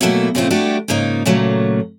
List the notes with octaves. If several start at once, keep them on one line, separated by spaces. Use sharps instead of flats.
B2 F#3 A3 A#3 E4
A#2 C#3 F3 A3 C4 F4
G3 A3 D4 E4 F#4 G4
G#2 C#3 A#3 D#4 F4
A#2 C#3 F#3 A3 A#3